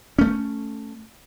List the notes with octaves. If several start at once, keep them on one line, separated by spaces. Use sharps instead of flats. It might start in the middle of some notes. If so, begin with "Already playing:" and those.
A3 C#4